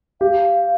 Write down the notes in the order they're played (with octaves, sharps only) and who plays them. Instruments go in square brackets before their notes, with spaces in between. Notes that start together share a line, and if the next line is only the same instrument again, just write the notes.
[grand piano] G4 [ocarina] F5